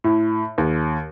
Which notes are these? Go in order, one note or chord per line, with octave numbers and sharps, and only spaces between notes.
A2
D#2